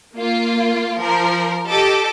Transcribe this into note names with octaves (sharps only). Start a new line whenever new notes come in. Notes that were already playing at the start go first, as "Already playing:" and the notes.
A#3 F4
F3 A#4
G4 A4 D#5 D6